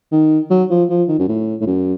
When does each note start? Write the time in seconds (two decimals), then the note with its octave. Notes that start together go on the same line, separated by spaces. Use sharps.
0.12 D#3
0.50 F#3
0.70 F3
0.89 F3
1.08 D#3
1.19 F#2
1.28 A2
1.60 A2
1.67 F#2